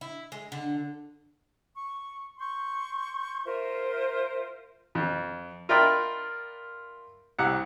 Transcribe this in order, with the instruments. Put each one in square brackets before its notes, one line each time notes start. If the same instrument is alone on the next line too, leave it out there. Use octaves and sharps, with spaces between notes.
[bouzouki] E4
G#3
D3
[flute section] C#6
C6 C#6 G6
F4 A#4 C5 E5
[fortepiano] F2
F4 A#4 D5 E5 G5 B5
C2 G4 F#5